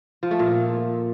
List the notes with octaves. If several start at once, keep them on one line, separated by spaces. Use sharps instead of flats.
F3
A3
A#2